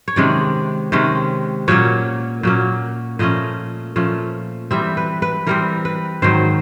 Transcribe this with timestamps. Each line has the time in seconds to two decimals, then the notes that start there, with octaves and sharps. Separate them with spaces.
0.08 C#5
0.16 C3 D#3 G#3 C#4 D5
0.92 C3 D#3 G#3 C#4
1.68 A#2 F#3 A#3 C#4 C#5
2.43 A#2 F#3 A#3 C#4
3.19 A#2 F3 A3 C#4 D#5
3.96 A#2 F3 A3 C#4
4.71 E3 G3 C4 E5
4.97 B4
5.22 B4
5.47 E3 G3 C4 A#4
5.85 B4
6.22 G#2 D#3 F#3 C5